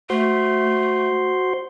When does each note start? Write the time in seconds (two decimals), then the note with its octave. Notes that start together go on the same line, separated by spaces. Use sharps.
0.10 A3 F#4 C5 C6